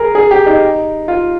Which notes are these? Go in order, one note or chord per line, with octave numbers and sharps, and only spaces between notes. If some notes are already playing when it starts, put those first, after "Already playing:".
Already playing: G#4 A#4
G#4
G4
D#4
F4